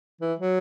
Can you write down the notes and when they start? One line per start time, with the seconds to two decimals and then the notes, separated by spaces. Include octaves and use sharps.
0.21 E3
0.39 F#3